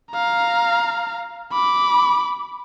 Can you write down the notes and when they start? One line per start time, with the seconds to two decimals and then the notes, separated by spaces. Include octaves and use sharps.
0.12 F5 A#5
1.53 B5 D6